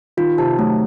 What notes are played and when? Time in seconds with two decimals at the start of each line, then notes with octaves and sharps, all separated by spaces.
0.17 D#3 F4
0.38 C3 A5
0.58 F#3 A3